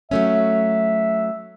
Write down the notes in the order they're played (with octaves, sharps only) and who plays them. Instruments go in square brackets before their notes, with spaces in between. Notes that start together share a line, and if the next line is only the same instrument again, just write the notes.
[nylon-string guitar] F#3 A3 C#4 [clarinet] E5